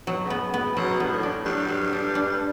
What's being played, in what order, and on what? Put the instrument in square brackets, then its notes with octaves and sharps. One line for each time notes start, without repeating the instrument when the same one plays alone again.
[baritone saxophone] B2 [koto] F#3
[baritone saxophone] C#3
[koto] B3
B3
[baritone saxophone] C#3
[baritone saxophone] B2 [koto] F#3
[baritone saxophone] G2 [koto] B3
[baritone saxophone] A2
[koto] D4
[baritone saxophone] G2 [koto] F#3
[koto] F#3
D4
D4